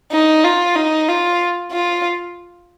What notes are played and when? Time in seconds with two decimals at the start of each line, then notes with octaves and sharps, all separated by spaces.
0.12 D#4
0.44 F4
0.76 D#4
1.08 F4
1.72 F4